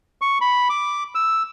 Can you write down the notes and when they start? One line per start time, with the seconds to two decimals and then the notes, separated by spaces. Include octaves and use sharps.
0.22 C#6
0.41 B5
0.70 D6
1.15 E6